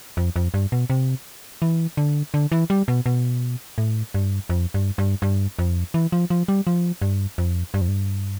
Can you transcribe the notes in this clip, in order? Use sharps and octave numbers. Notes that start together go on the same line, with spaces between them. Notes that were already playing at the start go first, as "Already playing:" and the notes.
F2
F2
G2
B2
C3
E3
D3
D3
E3
G3
B2
B2
A2
G2
F2
G2
G2
G2
F2
E3
F3
F3
G3
F3
G2
F2
G2
F2
G2